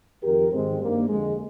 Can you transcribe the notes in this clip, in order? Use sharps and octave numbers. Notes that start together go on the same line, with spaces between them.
F2 D#3 G4 A#4
G#2 D#3 G#3 C4
G2 D#3 G3 A#3
F2 D3 G#3